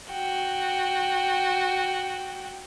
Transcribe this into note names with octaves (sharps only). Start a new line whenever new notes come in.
F#4 G5